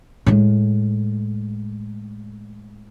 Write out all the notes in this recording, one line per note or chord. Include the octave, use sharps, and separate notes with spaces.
A2 G#3